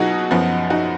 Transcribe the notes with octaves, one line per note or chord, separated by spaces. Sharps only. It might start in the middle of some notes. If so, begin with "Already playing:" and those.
Already playing: B2 F#3 D#4 F#4 G#4
F#2 F3 B3
D#4 F#4